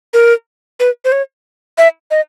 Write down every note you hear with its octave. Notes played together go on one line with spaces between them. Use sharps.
A#4
B4
C5
C#5
E5
D#5